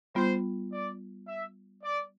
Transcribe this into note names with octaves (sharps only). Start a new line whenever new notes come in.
G3 B3 F4 C5
D5
E5
D5